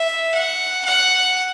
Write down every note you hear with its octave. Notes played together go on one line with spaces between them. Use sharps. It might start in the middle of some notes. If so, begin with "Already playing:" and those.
Already playing: E5
F#5
F#5